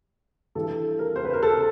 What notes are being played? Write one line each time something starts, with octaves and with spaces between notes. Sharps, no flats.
G2 E3 G3 A4
A#4
C5
B4
A#4
A4